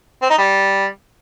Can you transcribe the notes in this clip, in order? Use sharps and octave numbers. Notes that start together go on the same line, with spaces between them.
C4
D#4
G3